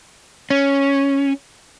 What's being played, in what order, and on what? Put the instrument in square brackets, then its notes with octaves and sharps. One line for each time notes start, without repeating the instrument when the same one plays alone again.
[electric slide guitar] C#4